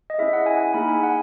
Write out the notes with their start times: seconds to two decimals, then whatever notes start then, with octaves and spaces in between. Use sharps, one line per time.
0.10 D#5
0.18 C#4 E4 G#4 E5
0.33 F#5
0.46 G#5
0.56 F#5
0.61 G#5
0.74 A#3 D#4 G#4 B5
0.89 G#5
1.03 F#5